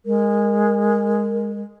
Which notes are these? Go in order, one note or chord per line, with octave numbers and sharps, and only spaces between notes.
G#3 A#4